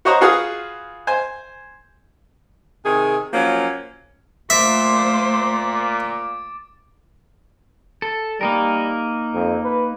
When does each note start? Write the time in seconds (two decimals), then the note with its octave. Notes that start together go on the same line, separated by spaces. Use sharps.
0.05 F#4 C5 C#5 D#5 F#5 A#5
0.21 F4 F#4 G#4 B4 F5 D#6
1.07 C5 G#5
2.85 C3 D#3 G#4
3.33 F3 F#3 A#3 C#4
4.50 A#2 A3 C5 E5 D6 A6 D7
8.02 A4
8.41 G3 A#3 D#4 A#4
9.34 F2
9.64 B4